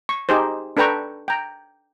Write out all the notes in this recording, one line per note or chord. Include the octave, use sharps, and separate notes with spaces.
C#6
D#4 G4 G#4 C5
D4 A4 B4 G5 A#5 C#6
G5 A#5